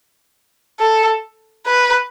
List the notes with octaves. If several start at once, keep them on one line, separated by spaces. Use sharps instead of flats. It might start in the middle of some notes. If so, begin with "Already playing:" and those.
A4
B4